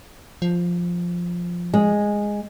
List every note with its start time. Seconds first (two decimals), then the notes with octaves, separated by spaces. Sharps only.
0.42 F3
1.74 G#3